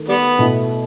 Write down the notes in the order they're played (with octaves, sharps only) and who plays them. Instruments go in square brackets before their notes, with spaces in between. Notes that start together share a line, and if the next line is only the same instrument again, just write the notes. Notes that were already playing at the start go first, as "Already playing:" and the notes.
Already playing: [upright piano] D#3 A3
[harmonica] G3 B3
[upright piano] B2 A3 E4